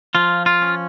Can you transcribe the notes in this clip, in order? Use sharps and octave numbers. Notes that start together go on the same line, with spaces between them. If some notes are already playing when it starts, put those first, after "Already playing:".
F3 F4
F4
C#4